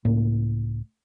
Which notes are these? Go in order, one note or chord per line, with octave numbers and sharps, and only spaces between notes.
C#2 A2 A#3